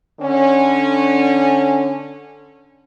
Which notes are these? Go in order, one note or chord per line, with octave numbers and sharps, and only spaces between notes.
D3 C#4